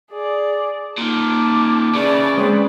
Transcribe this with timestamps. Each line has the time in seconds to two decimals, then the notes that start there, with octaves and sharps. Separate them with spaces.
0.11 G#4 D5
0.98 A#2 D#3 A5 D6
1.95 C#3 E3 G#4 D5
2.37 G#3 C4 B4 C#5